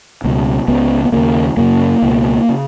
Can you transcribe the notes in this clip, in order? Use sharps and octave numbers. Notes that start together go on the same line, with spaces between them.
C#2 B2
C#2 C#3 B3
B3
D#2 C#3 A#3
F#2 C#3 A#3
C#2 B2
C#3